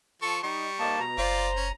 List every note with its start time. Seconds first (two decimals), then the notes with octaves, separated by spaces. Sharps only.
0.22 F3 A4 C#6
0.43 G3 D#4 C#6
0.79 F2 A2 A#3 D#4 A5
1.00 B2 A#5
1.18 F#1 F4 C5 D5
1.56 C#4